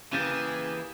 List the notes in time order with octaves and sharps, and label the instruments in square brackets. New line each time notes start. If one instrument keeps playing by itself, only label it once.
[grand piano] C#3 G6 A6 [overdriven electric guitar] E3 [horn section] A#3 G4 G#4